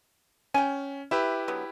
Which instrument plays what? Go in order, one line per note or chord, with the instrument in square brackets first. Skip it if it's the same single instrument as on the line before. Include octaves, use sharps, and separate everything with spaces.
[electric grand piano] C#4 [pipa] G5 G#5
[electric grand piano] E4 G4 B4 [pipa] E5
[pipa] D3 F#3 B3